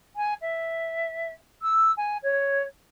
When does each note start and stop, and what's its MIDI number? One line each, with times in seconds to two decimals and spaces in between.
0.16 0.34 80
0.41 1.32 76
1.62 1.91 88
1.97 2.17 80
2.23 2.63 73